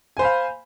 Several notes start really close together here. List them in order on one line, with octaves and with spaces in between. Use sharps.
G#5 C5 B5 F5